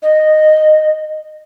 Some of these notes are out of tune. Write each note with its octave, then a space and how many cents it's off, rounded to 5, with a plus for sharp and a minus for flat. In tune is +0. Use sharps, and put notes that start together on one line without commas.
D#5 -10